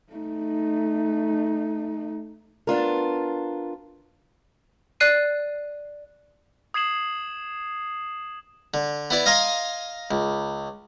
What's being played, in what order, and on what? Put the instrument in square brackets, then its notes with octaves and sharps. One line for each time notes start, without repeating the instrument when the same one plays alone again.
[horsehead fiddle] A3 D#4
[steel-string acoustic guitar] B3 D4 F4 A#4
[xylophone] D5 F#6 C7 D#7
[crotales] D#6 G#6 C7 E7 F#7
[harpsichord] D3
B3 E4 D5
D#5 F5 G#5 A#5 C6
C#2